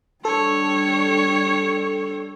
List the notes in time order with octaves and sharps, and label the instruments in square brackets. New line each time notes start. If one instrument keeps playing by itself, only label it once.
[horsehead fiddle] G3 D4 [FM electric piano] A4 [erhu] C#5